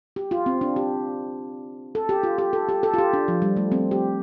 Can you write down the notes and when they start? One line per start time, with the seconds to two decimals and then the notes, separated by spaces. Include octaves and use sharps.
0.16 G4
0.31 F4
0.46 C4
0.61 D4
0.76 G4
1.95 A4
2.09 G4
2.23 F4
2.38 G4
2.53 A4
2.69 G4
2.83 A4
2.94 F4
2.98 G4
3.13 D4
3.28 F3
3.42 G3
3.57 A3
3.72 C4
3.91 G4